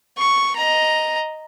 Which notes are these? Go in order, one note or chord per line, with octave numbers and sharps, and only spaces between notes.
C#6
D#5 A#5